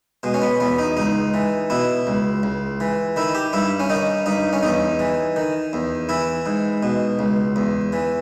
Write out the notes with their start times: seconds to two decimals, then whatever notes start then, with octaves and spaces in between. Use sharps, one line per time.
0.23 B2 G#3
0.34 C#4
0.42 B3
0.60 E2 B3
0.79 D#4
0.97 C#2 D#4
1.34 E3
1.70 B2 E4
2.07 C#2
2.43 C#2
2.80 E3
3.16 D#3 E4
3.35 G4
3.53 G2 E4
3.80 C#4
3.90 D#3 D#4
4.26 G2 D#4
4.53 C#4
4.63 E2 D#4
4.99 E3
5.36 D#3
5.73 E2
6.09 E3 E4
6.46 G#2
6.83 B2
7.19 C#2
7.56 E2
7.93 E3